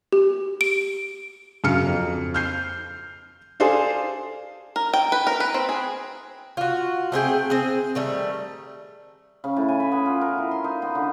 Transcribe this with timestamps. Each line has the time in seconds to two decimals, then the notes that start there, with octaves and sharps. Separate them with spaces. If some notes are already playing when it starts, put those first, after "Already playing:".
0.12 G4
0.61 D7
1.64 F#2 C#3 F5 F6 C#7
1.87 F2
2.34 F6 G6 C7
3.60 G#4 A4 C5 D5 F5
4.76 A#4
4.94 G5
5.12 B4
5.27 A#4
5.40 B4
5.54 C4
5.69 G#4
6.57 F4 F#4
7.12 A3 C4 G#4 G5
7.50 C4 G#4
7.95 D#3 G3 A3
9.44 C#3
9.56 A2
9.68 G#5
9.80 B5
9.92 B3
10.06 F4
10.21 A#4
10.38 E4
10.51 C6
10.64 D#4
10.82 B3
10.95 D3